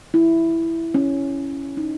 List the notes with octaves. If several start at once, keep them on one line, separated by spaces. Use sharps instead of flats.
E4
C#4
D#4